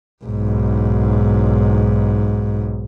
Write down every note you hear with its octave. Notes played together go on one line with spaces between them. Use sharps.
B1 G#2